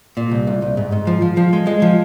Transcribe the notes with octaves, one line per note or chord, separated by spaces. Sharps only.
A#2
C2
C2
C2
G#2
G#2
F3
F3
F3
G#3
G#3
F3